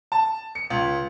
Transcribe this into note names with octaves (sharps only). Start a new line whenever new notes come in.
A5
C#7
C#2